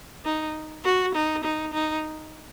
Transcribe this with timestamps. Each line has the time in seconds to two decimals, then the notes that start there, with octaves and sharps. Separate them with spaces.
0.25 D#4
0.84 F#4
1.15 D#4
1.44 D#4
1.73 D#4